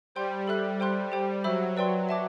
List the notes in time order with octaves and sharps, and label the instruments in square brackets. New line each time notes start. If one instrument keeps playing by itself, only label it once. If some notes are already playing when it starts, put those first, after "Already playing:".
[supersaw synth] G3 [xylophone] C5 G5 C6 G6
[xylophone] A4 E5 B5 F#6
C5 G5 C6 F#6
G4 C5 G5
[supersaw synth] F#3 [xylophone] C5 E5 B5 E6
[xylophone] B4 D5 G5 C6
E5 A5 D6